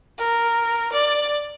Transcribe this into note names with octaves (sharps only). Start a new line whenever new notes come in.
A#4
D5